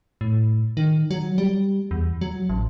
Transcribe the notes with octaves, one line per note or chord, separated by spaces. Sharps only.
A2
D#3
F#3
G3
E2
F#3
A1